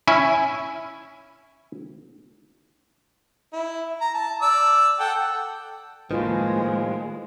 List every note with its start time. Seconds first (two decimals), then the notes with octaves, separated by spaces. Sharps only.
0.08 C#4 E4 G#5
3.53 E4
4.01 A#5
4.15 A5
4.42 D5 E6
4.99 A4 F#5 G5
6.11 A2 D#3 F3 G#3 A#3 F4 B4 C5